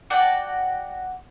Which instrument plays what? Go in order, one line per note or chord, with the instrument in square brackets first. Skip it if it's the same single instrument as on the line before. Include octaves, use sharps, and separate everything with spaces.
[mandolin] F#4 D5 G5 A5